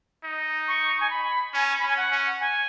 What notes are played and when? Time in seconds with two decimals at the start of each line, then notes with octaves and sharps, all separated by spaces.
0.24 D#4
0.68 C#6
1.00 G#5
1.10 B5
1.54 C#4 G#5
1.79 C#4 B5
1.89 G#5
1.97 F#5
2.12 C#4
2.41 G#5